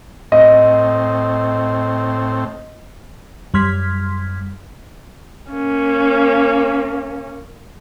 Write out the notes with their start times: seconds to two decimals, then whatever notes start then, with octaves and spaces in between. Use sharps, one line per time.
0.32 A2 C4 D#5
3.54 F#2 G3 C6 F6 G#6 B6
5.51 A#3 C#4